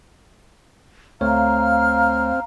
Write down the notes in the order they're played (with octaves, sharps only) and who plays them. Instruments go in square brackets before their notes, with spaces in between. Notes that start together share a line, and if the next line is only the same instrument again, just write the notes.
[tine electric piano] D2 A3 C#5 [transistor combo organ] C4 [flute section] F5 A#5 [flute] F6